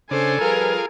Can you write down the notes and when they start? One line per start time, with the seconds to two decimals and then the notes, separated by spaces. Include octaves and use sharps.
0.11 C#3 D4 A4 C5 G#5
0.41 F3 G3 F4 G#4 A#4 B4